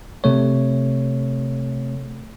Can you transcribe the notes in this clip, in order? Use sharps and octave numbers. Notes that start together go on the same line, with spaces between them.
C3 A3 C#5